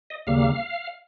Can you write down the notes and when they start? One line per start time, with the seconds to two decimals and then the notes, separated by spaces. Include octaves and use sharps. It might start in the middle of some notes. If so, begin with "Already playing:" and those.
0.10 D#5
0.27 D#2 C#3 G3 A#3 F5